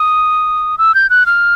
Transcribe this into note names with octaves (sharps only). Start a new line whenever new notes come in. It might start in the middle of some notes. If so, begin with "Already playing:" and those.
Already playing: D#6
E6
G6
F#6
F6